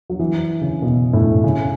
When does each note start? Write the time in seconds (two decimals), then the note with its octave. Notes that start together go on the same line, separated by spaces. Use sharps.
0.10 F#3
0.19 E3
0.61 C#3
0.82 B2
1.13 A2
1.44 C#3